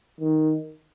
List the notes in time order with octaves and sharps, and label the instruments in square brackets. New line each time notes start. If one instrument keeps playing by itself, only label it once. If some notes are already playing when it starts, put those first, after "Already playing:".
[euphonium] D#3